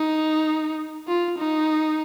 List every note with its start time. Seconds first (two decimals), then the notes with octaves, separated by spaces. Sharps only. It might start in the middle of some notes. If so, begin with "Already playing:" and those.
Already playing: D#4
1.08 F4
1.38 D#4